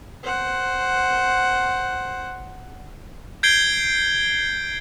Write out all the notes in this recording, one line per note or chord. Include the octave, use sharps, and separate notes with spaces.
C5 F#5
G6 G#6 C7 D7 G7